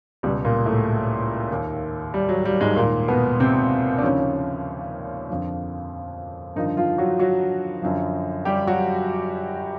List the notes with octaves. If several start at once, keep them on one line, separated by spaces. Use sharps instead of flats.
C#2 B2 G3
A#2 A#3
A2 A3
D#2 D#3
G3
F#3
G3
G#2 G#3
D#2 A#2 D#3 A#3
B2 B3
C3 C4
D4
D#2 C#3 F3 C#4
F2 D3 F3
G2 D3 D#3 F3 D#4
F3 F4
F#3 F#4
F#3 F#4
F#2 D3 F3
G3 G4
F#3 F#4